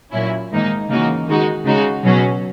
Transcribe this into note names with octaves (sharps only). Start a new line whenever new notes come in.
A#2 F#3 C#4 E4
G#2 D#3 A#3 D#4
C#3 E3 A#3 D#4 F#4
D#3 G#3 D#4 F#4
C#3 G#3 D#4 F#4
B2 F#3 C#4 F#4